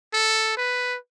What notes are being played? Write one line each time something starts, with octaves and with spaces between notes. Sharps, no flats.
A4
B4